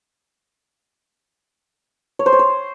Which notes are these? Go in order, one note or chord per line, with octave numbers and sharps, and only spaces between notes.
C#5
C5
C#5
C5